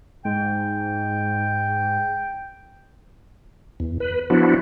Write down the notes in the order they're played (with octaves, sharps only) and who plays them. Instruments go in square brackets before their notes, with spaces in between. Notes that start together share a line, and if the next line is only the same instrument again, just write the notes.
[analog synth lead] G#2 [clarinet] G5
[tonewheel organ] E2
B4
F3 B3 D4 E4 F#4